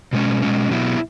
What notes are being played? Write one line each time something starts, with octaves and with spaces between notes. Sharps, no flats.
B2 G#3 C#4
B2 G#3 C#4
B2 F#3 B3 E4